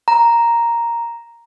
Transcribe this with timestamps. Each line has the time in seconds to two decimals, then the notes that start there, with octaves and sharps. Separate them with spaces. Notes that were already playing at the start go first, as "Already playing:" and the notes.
0.08 A#5